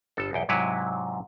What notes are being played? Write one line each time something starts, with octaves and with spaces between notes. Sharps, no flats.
G1 A4
B1 E2 G5
G#2 C3 F#3 E4 B4 C#5